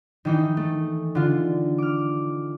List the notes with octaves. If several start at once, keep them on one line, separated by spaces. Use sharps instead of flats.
D#3 E3 D#4
A3
D3 F4
D6 F6